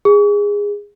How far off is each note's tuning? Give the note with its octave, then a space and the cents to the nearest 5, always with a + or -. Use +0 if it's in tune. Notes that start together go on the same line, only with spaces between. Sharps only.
G#4 -20